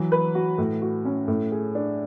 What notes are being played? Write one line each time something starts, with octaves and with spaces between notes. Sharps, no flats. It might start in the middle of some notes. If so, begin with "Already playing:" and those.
Already playing: E3 F#3
B4
F#4
A2
F#4
C#4
A2
G#4
D4